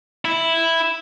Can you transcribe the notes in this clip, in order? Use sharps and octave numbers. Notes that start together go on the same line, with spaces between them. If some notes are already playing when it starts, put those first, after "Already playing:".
E4